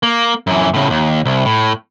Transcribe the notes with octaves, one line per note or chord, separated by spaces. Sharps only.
A#3
F#2 E3
A2 C#3
D#2
C2
A2